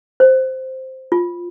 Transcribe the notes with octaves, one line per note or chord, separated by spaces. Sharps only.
C5
F4